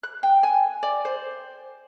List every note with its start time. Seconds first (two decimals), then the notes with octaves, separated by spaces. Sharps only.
0.03 F#6
0.23 G5
0.43 G#5
0.83 D5
1.05 C5